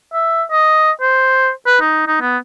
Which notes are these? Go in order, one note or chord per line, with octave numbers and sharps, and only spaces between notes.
E5
D#5
C5
B4
D#4
D#4
B3